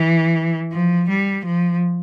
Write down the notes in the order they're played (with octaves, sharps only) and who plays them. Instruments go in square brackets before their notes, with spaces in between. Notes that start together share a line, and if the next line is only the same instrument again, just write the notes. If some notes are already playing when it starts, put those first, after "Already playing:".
Already playing: [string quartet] E3
F3
G3
F3